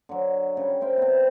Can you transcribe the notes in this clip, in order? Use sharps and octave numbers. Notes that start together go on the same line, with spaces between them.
D3 F#3
C#3 G3
A#4 C5 E5 G5
C3 B3